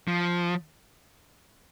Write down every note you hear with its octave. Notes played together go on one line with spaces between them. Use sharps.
F3